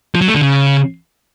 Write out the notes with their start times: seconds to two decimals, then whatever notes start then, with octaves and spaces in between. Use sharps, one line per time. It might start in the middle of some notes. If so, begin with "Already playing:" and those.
0.15 F3
0.21 F#3
0.28 A3
0.35 D3
0.41 C#3